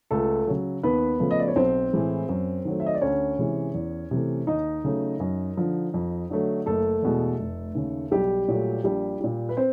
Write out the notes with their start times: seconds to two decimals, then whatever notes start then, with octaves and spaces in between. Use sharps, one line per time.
0.11 C#2 A3 A4
0.47 C#3 F#3
0.83 D#2 B3 B4
1.20 C#3 F3 A3
1.31 D#5
1.40 D5
1.48 C#5
1.56 B1 C4 C5
1.93 A2 E3 G#3
2.29 F#2
2.65 D#3 F#3 A3
2.80 E5
2.86 D#5
2.95 D5
3.01 D2 C#4 C#5
3.38 C3 E3 G#3
3.74 E2
4.11 C3 E3 A3
4.47 D#2 D#4 D#5
4.84 C#3 F#3 A3
5.20 F#2
5.57 D3 F3
5.94 F2
6.30 D3 F#3 A3
6.66 F#1 A3 A4
7.02 E2 B2 G#3
7.39 F1
7.75 D#2 C#3
8.11 B1 G3 G4
8.48 A#2 F#3 A3
8.84 A#1 G3 G4
9.21 A#2 G3
9.49 B4
9.57 C4 C5